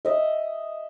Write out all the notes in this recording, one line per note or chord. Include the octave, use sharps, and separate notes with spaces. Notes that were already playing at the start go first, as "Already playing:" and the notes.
D#5 E5